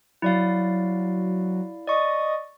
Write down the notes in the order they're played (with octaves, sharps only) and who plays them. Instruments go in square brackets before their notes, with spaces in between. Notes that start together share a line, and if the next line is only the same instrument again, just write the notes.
[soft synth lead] F#3 [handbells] E4 D5 F5
[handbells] D5 C#6 [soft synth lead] D#5